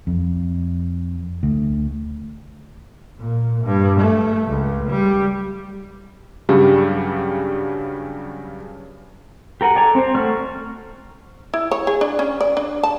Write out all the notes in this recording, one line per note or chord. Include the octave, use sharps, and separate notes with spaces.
F2
D2
A#2
G2
A3
C#2
G3
G2 C#3 F#3 G3
G4 A#4 F#5 G#5
A4 D5 G#5 A#5
C4 C5
A3 F#4 D5 C#6 F6
E4
C#5
G#4
D4
C#4
D5
D4
A5